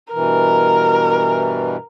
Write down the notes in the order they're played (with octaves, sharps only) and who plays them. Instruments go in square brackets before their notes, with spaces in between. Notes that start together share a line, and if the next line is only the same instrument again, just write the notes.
[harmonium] G2 B2 E3 [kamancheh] A#4